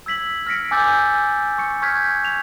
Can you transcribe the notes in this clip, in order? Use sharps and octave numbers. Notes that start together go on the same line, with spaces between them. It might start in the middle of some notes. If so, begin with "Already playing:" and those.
E6 G#6 B6 F#7
F6 A#6 B6 C#7 D7
G#5 D6 E6 G6 A6
C#6 C#7
C#6 F6 G6 G#6 B6
F7